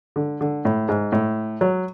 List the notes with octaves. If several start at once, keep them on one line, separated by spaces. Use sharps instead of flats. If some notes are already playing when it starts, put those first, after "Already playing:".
D3
D3
A2
G#2
A2
F#3